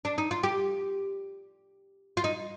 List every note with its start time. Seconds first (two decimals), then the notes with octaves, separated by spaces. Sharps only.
0.05 D4
0.18 D#4
0.31 F4
0.43 G4
2.17 F4
2.24 D#4